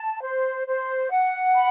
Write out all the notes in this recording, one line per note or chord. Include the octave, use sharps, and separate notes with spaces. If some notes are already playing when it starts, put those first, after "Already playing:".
Already playing: A5
C5
C5
F#5
B5